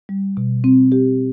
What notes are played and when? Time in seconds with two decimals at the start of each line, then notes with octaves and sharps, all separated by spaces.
0.09 G3
0.37 B2
0.64 C4
0.92 G4